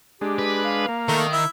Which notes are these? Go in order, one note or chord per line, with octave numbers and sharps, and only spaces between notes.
G#3 D4 G4
B4
F5
A#3
D#3 A3 A#4
E4 E5